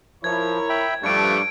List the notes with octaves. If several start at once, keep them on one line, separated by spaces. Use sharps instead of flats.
F3 E4 A#4 C#5 G#6
E5 G5 B5
G2 F3 G3 A3 D4 C#6 G#6 D7